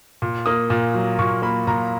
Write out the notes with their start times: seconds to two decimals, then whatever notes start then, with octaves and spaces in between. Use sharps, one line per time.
0.22 A#2
0.46 A#3 D#6
0.70 A#2
0.94 F#3
1.19 A#2 C#6
1.42 A#3 B5
1.67 A#2 A#5